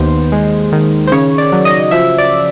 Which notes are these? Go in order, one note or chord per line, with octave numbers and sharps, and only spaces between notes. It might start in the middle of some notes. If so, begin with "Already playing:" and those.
Already playing: D#2 B3 C5
G#3
D#3
C5
C#3 C#5
D5
F#3
D#5
F3 E5
D5